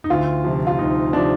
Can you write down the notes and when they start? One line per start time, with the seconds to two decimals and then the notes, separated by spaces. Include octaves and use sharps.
0.04 D#4
0.10 D2 F4
0.44 C3 F3
0.67 F4
0.78 D2 D#4
1.13 C3 F3 D4